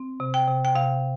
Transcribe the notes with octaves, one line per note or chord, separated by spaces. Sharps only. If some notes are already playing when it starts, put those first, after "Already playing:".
Already playing: C4
C3
G5
C3
G5
C3 F5